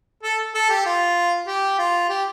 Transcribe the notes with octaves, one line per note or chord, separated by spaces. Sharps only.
A4
A4
G4
F4
G4
F4
G4